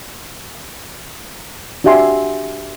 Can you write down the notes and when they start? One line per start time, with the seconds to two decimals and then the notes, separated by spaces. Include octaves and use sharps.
1.84 D4 F#4 G4 E5 G#5 C6